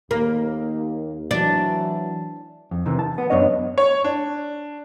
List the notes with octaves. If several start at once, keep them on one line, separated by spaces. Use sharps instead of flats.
D#2 A#3
E3 F#3 D4
F2
C3 D#3 E3
A5
B3
F#2 G#3 B3 D4 C#5 D#5
C#5
D4